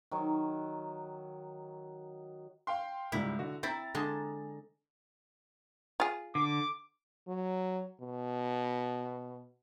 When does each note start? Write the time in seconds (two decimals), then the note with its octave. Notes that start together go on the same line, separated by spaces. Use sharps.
0.11 D#3 F#3
2.67 F5 G5 C6
3.12 C#2 G#2 G3 E4
3.39 D3 F#4
3.63 C4 E4 A#5 A6
3.95 D3 G#3 A5
6.00 F4 G#4
6.35 D3 D6
7.28 F#3
8.01 B2